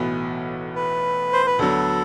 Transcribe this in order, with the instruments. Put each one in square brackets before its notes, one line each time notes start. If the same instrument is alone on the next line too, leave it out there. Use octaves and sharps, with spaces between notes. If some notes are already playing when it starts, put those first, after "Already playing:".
Already playing: [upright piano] B1 A2 E3 B3 F#4
[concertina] B4
C5
B4
[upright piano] D2 D3 F#3 B3 [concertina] A4